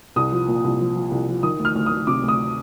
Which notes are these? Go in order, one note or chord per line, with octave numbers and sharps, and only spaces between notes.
C2 D#6
F3
A#2
C2
F3
F3
C2
F3
D#3 D#6
D2
F6
D2
D#6
D2
C3 D6
D2 D#6